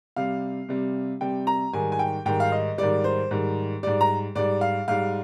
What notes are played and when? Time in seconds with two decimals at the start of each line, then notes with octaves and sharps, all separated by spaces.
0.16 C3 G3 F5
0.69 C3 G3
1.21 C3 G3 G5
1.47 A#5
1.73 G#2 D#3 G3 G#5
1.92 G#5
1.99 G5
2.26 G#2 D#3 G3 G5
2.40 F5
2.52 D#5
2.78 G#2 D#3 G3 D5
3.04 C5
3.31 G#2 D#3 G3
3.83 G#2 G3 D5
4.01 A#5
4.35 G#2 G3 D5
4.61 F5
4.88 G#2 G3 F5